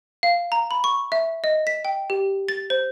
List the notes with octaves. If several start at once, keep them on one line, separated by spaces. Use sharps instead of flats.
F5
A#5
B5
C#6
E5
D#5
B6
G5
G4
A6
C5